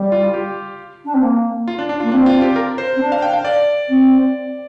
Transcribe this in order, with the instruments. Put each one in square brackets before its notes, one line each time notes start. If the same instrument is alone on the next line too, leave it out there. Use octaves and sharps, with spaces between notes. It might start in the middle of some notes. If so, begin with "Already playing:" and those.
Already playing: [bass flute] G3
[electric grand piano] F4
F4
G4
[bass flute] D4
C4
A#3
[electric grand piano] F4
D4
D4
[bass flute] A#3 [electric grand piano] F4
[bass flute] C4 [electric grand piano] D4
[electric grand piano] F4
G4
A#4
C5
[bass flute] C4
D4
[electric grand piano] F5
G5
F5
D5
[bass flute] C4